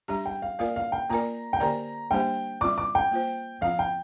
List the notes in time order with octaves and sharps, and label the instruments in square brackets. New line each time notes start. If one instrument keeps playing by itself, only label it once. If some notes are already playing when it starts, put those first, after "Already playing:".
[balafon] G3 D4 G4 [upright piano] A#5
[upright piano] G5
F5
[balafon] A#3 F4 A#4 D5 [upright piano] F5
[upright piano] F5
G5
[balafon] A#3 F4 A#4 D5 [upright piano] A#5
[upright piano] G5
[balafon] D3 A#3 G4 A#4 D5 [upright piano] A#5
[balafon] G3 A#3 D4 G4 C5 [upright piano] G5
[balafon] G3 C4 F4 D5 [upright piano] D6
[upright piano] D6
G5
[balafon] A#3 F4 C5
[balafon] F3 C4 F4 [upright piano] F5
[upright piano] G5